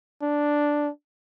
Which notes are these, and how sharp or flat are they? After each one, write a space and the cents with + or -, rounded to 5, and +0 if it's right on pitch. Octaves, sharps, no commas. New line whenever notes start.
D4 +0